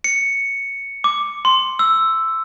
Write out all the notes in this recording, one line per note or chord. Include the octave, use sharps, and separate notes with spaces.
C#7
D6
C6
E6